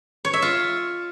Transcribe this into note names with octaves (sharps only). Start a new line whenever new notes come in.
C#5
E5
F4